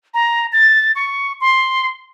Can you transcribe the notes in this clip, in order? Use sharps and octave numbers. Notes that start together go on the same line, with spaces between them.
A#5
A6
C#6
C6